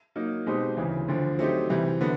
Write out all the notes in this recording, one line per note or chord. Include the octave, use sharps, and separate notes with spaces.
F#3 A#3 D#4
B2 G#3 C4 D#4 G4
D2 C#3 E3
D2 D3 F3
F#3 A3 C4 D#4 G4
C3 E3 G3
D3 F#3 B3